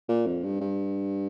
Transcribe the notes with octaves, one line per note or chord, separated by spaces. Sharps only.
A#2
F2
G2
G2